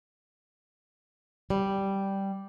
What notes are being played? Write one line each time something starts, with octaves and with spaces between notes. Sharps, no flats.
G3